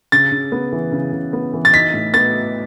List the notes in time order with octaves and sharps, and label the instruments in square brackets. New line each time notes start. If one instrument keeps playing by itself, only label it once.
[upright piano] C#3 [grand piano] A6
[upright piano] C#3
B3
E3
C#3
C#3
B3
E3
[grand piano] A6
[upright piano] D#4 [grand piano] B6
[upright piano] A2
[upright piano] B3 [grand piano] A6